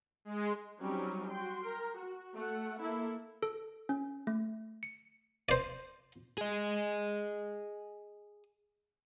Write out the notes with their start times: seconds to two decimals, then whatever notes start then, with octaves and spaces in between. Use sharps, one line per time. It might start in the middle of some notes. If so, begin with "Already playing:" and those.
0.25 G#3
0.80 F#3 G3 C4 C#4 D#4
1.29 F#4 G5 C6
1.63 A#4
1.97 F#4
2.34 A3 F#5
2.80 A#3 E4 A4
3.43 A4
3.89 C#4
4.27 A3
4.83 C#7
5.49 C5 D5
6.38 G#4 D#5